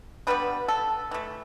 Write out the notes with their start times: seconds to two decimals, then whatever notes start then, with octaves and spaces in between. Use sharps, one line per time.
0.27 D3 G3 B3 B4
0.68 A4
1.11 E3 A3